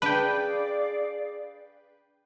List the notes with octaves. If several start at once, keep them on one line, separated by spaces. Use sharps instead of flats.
D4 G#4 B4 D5 F5 G5 B5